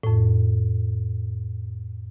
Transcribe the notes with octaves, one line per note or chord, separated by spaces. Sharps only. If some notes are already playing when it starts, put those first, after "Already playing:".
F2 A2